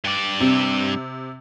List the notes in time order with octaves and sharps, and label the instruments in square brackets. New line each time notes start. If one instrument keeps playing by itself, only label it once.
[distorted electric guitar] G2 D5
[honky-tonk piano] C3